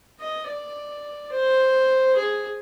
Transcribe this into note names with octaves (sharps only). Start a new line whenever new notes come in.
D#5
D5
C5
G#4